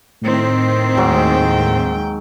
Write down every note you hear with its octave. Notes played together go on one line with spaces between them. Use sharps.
A2 D#3 C4
D#2 G#2 F#3 G5